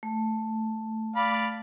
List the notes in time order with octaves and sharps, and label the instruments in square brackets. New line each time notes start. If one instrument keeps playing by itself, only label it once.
[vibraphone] A3
[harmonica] D5 F5 B5